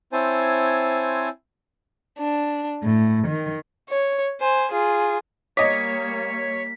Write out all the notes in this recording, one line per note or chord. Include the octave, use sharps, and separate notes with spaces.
C4 E4 C5 C#5 G#5 A5
D4
A2
D#3
C#5
C5 G#5
F4 G#4
G3 A#3 C#5 D#5 D6 B6